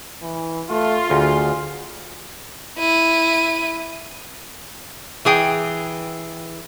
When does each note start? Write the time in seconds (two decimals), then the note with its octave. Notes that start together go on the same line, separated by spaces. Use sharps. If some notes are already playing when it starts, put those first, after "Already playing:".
0.22 E3
0.70 A3 F4
1.10 D2 G#4
2.79 E4 D#7
5.25 E3 G#4 G5